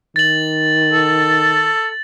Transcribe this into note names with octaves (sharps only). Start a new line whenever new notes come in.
D#3 A6 F#7
A4